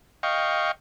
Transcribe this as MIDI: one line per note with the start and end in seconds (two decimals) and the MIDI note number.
0.23 0.72 75
0.23 0.72 77
0.23 0.72 79
0.23 0.72 85